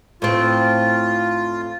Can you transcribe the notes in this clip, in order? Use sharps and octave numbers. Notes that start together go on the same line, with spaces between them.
A2 C4 F4